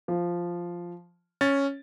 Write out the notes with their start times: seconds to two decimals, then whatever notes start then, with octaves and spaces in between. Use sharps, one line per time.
0.08 F3
1.41 C#4 A6